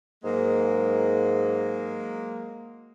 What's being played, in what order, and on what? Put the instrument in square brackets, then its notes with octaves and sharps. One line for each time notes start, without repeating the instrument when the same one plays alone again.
[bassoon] G#2 [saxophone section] F#3 G#3 A#3